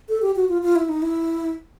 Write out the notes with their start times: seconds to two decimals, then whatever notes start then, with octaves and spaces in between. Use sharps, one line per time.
0.09 A4
0.22 G4
0.36 F#4
0.49 F4
0.63 F4
0.76 E4
0.89 D#4
1.02 E4